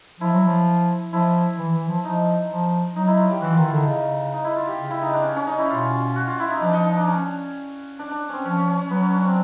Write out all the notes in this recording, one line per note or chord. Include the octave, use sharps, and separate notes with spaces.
F3 E4
F#3
F3
F3 E4
E3
E3
F3
F3 D#4
F3
F#3 D#4
E4
F4
G4
E3 F#4
D#3 F4
E4
D3 D#4
C#3
D#4
E4
F4
G4
C#3
E4
D#4
D4
C#4
C#4
D#4
E4
B2 F4
F#4
F4
E4
D#4
F3 D4
D#4
D4
C#4
D4
D4
C4 C#4
F3 C#4
C#4
C#4
C#4
F#3 B3
C#4
D4
C4